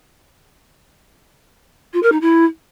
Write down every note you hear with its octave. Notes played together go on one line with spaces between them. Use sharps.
F4
A#4
D#4
E4